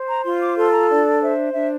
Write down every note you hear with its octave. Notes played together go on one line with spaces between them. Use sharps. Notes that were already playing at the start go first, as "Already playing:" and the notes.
Already playing: C5
A#5
F4 C6
D6
A4 C6
A#5
D4 D5
C5 E5
D4 E5